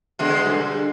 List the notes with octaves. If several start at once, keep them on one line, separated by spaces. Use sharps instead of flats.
B2 D3 G#3
G2 D3